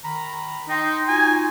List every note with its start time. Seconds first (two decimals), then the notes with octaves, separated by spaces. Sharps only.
0.02 D#3 A#5 B5
0.69 D#4 G5 C6
1.08 D#4 F4 F#4 G#5